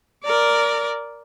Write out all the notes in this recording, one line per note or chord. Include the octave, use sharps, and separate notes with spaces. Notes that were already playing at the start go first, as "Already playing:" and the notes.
A#4 D5